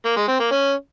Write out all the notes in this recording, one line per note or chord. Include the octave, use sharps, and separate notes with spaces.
A#3
G#3
C4
A#3
C#4